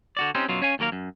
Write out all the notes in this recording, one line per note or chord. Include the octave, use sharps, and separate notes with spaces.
D3 F#4 D5
C4 C#4 D#4 G4 C5
F#2 B2 F#3 F4
C#4 C#5 F5 G#5
D#2 F#3 A#3 A#4 F5
F#2